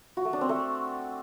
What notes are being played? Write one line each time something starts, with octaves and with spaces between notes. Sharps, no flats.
F#4
A3
D4
C4
A3